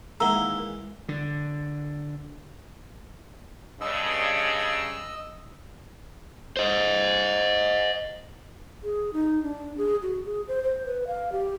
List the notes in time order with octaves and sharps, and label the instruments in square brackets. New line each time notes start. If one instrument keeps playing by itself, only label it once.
[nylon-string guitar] D#3 A#3 [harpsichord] E3 G#3 [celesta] F#5 E6 [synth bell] A#5 G7
[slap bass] D3
[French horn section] G2 C#3 [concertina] D#5 E6
[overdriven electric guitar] C5 D#5
[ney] G#4
D#4
D4
G#4
F#4
G#4
C5
C5
B4
F5
G4